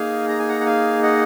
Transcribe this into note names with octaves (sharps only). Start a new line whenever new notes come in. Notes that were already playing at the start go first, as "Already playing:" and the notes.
Already playing: A#3 D#4 G#4 F5 G#5
A#5
G#5
F#5 A#5
F#5
F5 G#5
D#5 F#5